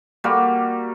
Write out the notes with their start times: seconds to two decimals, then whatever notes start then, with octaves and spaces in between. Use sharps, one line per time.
0.24 G3 A#3 F#4